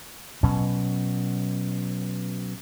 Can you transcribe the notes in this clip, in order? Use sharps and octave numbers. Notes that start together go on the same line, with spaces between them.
B2 F#3 C#4